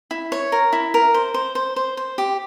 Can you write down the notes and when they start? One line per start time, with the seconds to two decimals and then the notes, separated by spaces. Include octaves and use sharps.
0.11 E4
0.32 C#5
0.52 A#4
0.73 E4
0.94 A#4
1.14 C5
1.34 C5
1.55 C5
1.76 C5
1.97 C5
2.18 G4